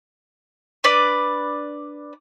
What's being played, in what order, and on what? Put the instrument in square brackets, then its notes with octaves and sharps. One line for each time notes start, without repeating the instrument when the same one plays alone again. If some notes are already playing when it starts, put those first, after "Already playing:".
[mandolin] D4 B4 D5